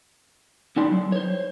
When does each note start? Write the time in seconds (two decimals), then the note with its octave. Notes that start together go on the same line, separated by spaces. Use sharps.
0.76 D#2 D#4 E4 D5 C6
0.91 F#3
1.12 C5 C#5